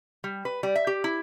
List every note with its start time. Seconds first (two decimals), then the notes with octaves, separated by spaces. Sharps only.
0.24 G3
0.45 B4
0.63 G3
0.75 E5
0.87 G4
1.04 E4